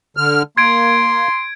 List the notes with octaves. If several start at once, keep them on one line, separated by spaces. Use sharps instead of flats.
D3 F6
A#3 C6 G#6 D7